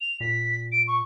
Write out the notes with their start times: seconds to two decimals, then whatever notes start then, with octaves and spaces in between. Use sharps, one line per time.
0.01 F7
0.20 A#2 B6
0.72 D7
0.88 C#6